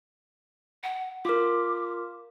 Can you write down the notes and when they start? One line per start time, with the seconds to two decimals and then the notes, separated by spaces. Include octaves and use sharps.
0.84 F#5
1.25 F4 A#4 D6